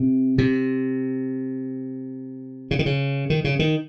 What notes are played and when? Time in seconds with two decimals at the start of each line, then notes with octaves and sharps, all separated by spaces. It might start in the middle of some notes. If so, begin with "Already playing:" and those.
Already playing: C3
0.38 C3
2.71 C#3
2.79 D#3
2.86 C#3
3.30 D#3
3.44 C#3
3.59 D#3